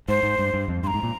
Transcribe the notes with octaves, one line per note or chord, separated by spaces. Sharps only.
G#2 C5
G#2
G2
G2
F2
G2 C6
A#5
G#2
A#2